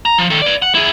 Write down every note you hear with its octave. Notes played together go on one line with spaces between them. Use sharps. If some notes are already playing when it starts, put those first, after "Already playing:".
A#5
F3
D#3 A4
B4 D5
F#5
E4 G#4